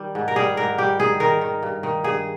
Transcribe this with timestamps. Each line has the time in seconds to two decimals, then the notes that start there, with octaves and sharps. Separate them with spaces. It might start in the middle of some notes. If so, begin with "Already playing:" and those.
Already playing: D#3 G3
0.15 G#2
0.28 A#4
0.36 G3 G#4
0.57 G#2 A#4
0.78 G3 G4
1.00 D#3 G#4
1.20 D#3 A#4
1.41 D#3
1.63 G2
1.83 D#3
2.04 G2 G#4